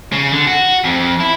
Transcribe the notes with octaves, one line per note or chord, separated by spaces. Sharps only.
C#3
D3
F#4
F2
E4